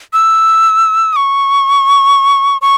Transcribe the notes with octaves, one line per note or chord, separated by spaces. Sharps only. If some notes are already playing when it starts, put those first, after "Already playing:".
E6
D#6
C#6
C#6